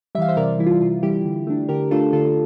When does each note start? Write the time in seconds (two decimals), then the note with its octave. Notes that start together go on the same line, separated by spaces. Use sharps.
0.15 G3 E5
0.18 E3 F5
0.28 C5 E5
0.37 C3 A#4 D5
0.59 E3 G3 E4
0.66 F4
0.81 C3 F4
1.03 E3 G3 E4 G4
1.25 D3
1.47 A3 D4
1.69 D3 G4 A#4
1.91 A3 D4 F4 A4
2.13 D3 F4 A4